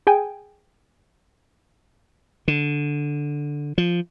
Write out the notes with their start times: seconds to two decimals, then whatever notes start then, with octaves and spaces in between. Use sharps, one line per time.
0.07 G#4 G5 G#5
2.48 D3
3.78 F3